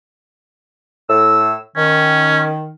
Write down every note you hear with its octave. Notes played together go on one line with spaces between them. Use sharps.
A2 E6
D#3 C#4